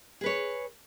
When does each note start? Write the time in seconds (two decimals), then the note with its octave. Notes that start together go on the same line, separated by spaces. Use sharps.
0.21 G#4
0.24 B4
0.26 C#5